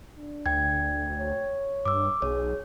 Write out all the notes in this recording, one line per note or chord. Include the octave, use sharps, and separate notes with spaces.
D4
D2 G5 G#6
C#5
G2 D6 E6
B1 G#4 C#5